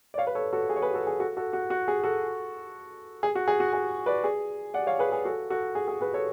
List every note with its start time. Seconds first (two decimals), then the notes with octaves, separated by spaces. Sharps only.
0.14 D5
0.18 C#5 F5
0.27 B4
0.35 A4 C#5
0.53 F#4 A4
0.70 G#4
0.76 C#5
0.82 G#4 B4
0.94 F#4 A4
1.07 G#4
1.20 F#4 A4
1.37 F#4 A4
1.53 F#4
1.70 F#4
1.88 G#4
2.04 F#4 A4
3.23 G#4
3.35 F#4
3.48 G#4
3.60 F#4
3.73 G#4
4.06 B4 D5
4.24 G#4
4.74 D5 F#5
4.87 C#5 F5
4.99 G#4 B4
5.12 G#4
5.25 F#4 A4
5.50 F#4 A4
5.75 G#4
5.88 G#4
6.01 G#4 B4
6.14 A4 C#5